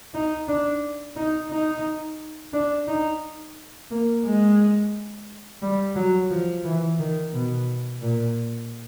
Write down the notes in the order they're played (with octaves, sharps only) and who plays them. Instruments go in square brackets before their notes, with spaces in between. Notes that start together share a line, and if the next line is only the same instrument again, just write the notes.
[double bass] D#4
D4
D#4
D#4
D4
D#4
A#3
G#3
G3
F#3
F3
E3
D#3
B2
A#2